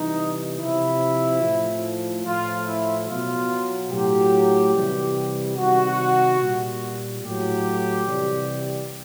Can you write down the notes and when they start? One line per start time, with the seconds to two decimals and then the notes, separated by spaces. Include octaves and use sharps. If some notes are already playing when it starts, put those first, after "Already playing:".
Already playing: C3 E3 G3 D#4
0.59 C3 F3 E4
1.42 A2 F3
2.25 A2 F3 F4
2.67 E4
3.08 B2 F#3 F4
3.90 A2 F#3 G4
4.74 C3 E3 G3
5.57 C3 D#3 G3 F#4
6.40 A#2 G3
7.23 A2 F#3 G4
8.06 C3 E3 G3